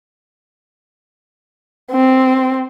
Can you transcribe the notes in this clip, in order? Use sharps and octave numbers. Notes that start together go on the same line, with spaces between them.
C4